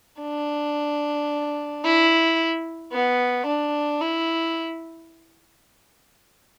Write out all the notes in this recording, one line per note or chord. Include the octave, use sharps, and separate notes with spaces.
D4
E4
B3
D4
E4